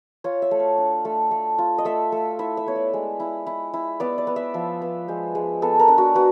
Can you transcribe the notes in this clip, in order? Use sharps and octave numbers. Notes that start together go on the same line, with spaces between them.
F4 C#5
E5
A3
F5
D4
A3
A3
F4
D#5
A3 E5
A3
E4 E5
E5
B3 C#5
D5
G#3
E4
E4
E4
B3 D5
D5
B3
E5
F3 E5
B3
G#3 C5
G#3
B3 A4
A#4
D4
F#4
B3 F#4